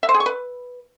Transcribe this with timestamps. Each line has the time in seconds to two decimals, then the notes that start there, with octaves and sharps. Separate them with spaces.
0.03 E5
0.09 C5
0.14 G#4
0.20 C#6
0.26 B4